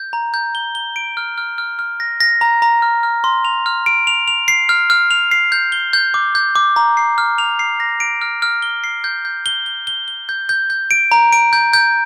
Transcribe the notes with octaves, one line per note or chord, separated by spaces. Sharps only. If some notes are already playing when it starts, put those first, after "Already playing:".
Already playing: G6
A#5
G6
G7
G7
D7
F6
F6
F6
F6
A#6
A#6
A#5
A#5
F6
F6
C6
F7
F6
D7
F7
F7
C7
F6
F6
F7
C7
G6
G7
G6
D6
G6
D6
A#5
C7
F6
F7
C7
A#6
D7
F6
F6
G7
C7
G6
G6
G7
G7
G7
G7
G6
G6
G6
D7
A#5
D7
G6
G6